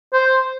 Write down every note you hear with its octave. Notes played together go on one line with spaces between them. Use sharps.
C5